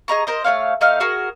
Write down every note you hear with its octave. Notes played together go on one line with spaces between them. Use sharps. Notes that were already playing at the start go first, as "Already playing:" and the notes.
G#4 D#5 A#5 C#6
A#4 C5 D#5
A3 C#4 C#5 F5
A3 D#4 F5 F6
F#4 G#4 A#4